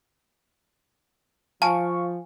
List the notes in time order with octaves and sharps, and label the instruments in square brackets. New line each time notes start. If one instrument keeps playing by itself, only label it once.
[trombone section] F3 [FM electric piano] F5 C#6 [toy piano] G#5 [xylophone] A5